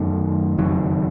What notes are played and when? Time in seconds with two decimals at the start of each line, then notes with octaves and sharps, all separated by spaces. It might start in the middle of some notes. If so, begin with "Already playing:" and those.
Already playing: F#2 D#3 A3
0.58 F#1 F2 D#3 F#3